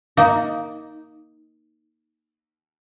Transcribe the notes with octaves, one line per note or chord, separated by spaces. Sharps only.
A#3 D#4